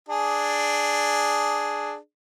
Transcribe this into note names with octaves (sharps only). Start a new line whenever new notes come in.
D4 G#4